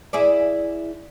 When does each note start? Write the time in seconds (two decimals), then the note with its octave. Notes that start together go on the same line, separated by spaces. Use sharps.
0.13 E4 G#4 D5